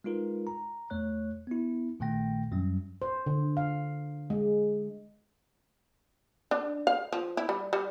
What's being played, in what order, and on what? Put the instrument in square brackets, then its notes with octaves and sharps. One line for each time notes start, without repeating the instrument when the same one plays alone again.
[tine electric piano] G#3 D#4 F4 A#4 B4
A#5
E2 A3 C#5 F#6
B3 E4
A#1 A#2 D#3 A3 G5 A#6
F#2 F#3 G3 C#4
[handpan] C5
D3
F5
G#3
[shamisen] D4
F5
F3
E4
G3
G3